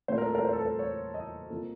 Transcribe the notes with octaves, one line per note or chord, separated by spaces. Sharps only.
A#2 A3 C4 C5
A#4
A4
A#4
C5
A4
A#4
C#5
D#5
C3 F3 A#3